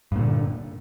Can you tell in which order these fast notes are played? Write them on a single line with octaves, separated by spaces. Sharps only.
G2 A#2 D3